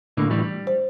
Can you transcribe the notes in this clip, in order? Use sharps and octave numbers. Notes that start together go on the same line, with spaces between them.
A2 D3 A#3 D4
A2 E3 G3
G3
C5